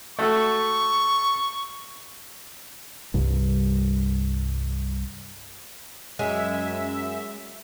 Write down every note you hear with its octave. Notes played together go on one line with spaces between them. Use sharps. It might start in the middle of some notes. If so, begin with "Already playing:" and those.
A3 F#4 A4 C#6
C2 G2
F#2 G#3 E5